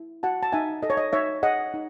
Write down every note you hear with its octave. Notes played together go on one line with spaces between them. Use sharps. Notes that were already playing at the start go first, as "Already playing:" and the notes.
Already playing: E4
F#4 F#5 A5
A5
D#4 E5 G#5
A4 D#5
C#5
D#5
D#4 C#5 E5
G#4 D#5 F#5
D#4